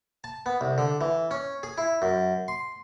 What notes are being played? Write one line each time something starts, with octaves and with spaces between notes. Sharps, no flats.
A5
B3
C2
D3
E3
C#4
G#4
E4
F#2
C6